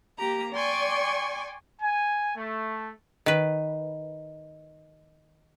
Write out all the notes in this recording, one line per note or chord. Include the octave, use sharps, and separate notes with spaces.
A#3 G4 A#5
D5 G5 G#5 C6 C#6
G#5
A3
D#3 B4